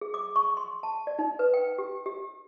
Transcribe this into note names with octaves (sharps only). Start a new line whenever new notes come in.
G#4
D6
C#6
C6
A5
D5
D#4
B4
G5
G4
G4